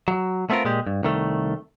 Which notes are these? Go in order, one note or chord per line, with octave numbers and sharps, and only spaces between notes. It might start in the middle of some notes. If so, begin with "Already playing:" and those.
F#3
A3 B3 C4 F4 A#4
A#2 G#3 G4
G2
C2 D#3 A3